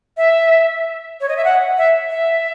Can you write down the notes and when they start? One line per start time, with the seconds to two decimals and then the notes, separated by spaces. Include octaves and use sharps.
0.17 E5
1.21 C#5
1.29 D#5
1.37 E5
1.44 F#5
1.77 E5
2.09 E5